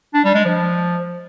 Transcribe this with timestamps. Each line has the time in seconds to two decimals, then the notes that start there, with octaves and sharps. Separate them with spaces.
0.14 D4
0.24 G3
0.35 G#3
0.45 F3